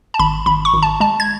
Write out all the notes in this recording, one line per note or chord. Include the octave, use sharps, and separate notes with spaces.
A5
G#1 B5
G#1 B5
C#6
G#1
A5
G#3 A5
G#6